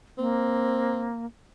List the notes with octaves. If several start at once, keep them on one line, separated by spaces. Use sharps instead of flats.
A#3 C4